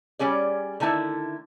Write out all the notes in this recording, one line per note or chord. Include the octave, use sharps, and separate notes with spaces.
G3 C#4 G#4 D5
D3 D#3 A3 E4